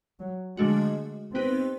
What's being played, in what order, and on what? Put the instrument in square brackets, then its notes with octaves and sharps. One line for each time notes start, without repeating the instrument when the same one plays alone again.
[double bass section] F#3
[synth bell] D3 F3 A3 D4 F#4 [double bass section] G#3
[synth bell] B3 D#4 G4 B4 [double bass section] C4